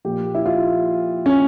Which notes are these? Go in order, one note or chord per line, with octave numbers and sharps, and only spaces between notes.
A#2 F3 G4
E4
F4
C#4